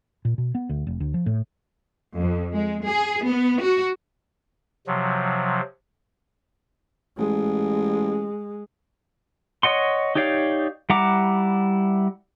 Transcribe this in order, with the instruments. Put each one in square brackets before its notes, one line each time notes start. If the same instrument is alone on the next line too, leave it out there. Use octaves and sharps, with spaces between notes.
[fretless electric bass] A#2
B2
B3
D2
F1
D2
F3
A2
[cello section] F2
G#3
G#4
B3
F#4
[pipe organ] C3 F3 F#3
[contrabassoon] A1 [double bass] G#3
[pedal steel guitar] C#5 D#5 F#5 C6
D#4 G4 C#5 D5 F5
G3 E4 F#5 A#5 D6